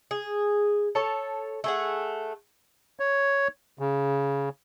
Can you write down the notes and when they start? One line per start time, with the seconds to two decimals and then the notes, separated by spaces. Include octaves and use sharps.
0.11 G#4
0.95 A4 C#5 A5
1.64 A3 G#4 F#5
3.00 C#5
3.79 C#3